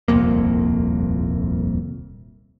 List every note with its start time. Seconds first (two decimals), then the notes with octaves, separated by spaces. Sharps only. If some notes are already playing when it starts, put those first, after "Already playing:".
0.08 D#1 C2 F2 A#3